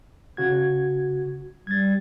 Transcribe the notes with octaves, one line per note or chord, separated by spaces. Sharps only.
C#3 F#4 G#6
G3 G#6 A6